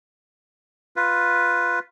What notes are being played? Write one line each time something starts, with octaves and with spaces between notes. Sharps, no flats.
F4 B4